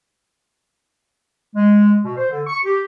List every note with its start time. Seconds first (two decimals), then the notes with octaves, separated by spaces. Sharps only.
1.55 G#3
2.03 B2
2.17 C5
2.30 D3
2.47 C#6
2.65 G4